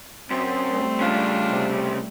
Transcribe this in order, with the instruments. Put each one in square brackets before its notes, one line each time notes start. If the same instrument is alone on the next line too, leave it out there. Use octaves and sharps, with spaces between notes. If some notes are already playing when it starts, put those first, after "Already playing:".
[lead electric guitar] F#2 [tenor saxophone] C4
[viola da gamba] G3 A3
[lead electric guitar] C#2 C#3 [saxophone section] D4 F4
[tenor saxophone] C3